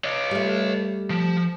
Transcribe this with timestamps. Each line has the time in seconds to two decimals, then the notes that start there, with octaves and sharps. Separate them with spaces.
0.04 C#5 D#5
0.31 G3 A3
1.10 F3